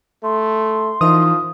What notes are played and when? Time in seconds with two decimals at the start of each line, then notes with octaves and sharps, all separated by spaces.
0.23 A3 C6
1.01 E3 F3 D#4 A#4 D#6